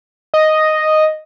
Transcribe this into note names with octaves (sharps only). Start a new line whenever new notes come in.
D#5